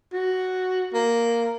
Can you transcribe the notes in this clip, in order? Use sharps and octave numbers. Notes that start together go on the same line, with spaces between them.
F#4
A#3